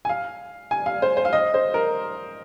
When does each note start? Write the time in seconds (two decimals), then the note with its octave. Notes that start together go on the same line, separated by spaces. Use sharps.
0.05 G#5
0.09 F5
0.71 G#5
0.86 F5
1.02 C5
1.17 C5
1.25 F5
1.33 D#5
1.54 C5
1.74 A#4